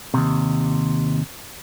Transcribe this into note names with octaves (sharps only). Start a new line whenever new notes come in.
D#2 C3